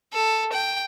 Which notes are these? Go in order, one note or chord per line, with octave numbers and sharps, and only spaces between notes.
A4
G5